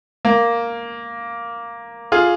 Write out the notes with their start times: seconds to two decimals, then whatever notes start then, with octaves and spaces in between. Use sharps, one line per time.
0.25 A#3
2.12 F4 G#4